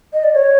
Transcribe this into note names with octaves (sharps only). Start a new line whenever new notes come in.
D#5
D5
C#5